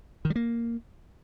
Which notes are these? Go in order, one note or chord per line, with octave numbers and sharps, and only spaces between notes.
D#3
G3
A#3